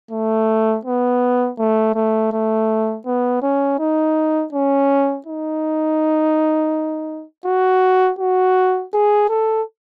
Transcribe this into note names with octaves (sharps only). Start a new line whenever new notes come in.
A3
B3
A3
A3
A3
B3
C#4
D#4
C#4
D#4
F#4
F#4
G#4
A4